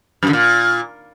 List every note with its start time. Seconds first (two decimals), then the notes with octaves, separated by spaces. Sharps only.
0.23 F#2
0.28 D3
0.33 A#2